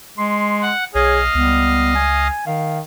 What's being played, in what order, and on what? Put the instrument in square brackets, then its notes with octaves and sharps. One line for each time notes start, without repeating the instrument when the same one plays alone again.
[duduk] G#3 [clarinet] C6
[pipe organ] F#5
[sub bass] B1 [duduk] G#4 [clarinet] C#5 [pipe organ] D#5 F5
[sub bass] C#2 [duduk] G3 [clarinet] B3
[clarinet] G#5
[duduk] D#3 [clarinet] F5